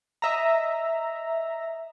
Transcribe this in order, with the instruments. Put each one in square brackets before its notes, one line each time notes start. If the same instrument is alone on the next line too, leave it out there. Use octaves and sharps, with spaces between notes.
[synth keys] D#5 E5 A#5